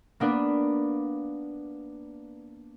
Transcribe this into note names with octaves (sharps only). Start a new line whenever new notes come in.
A#3 B3 D4 B4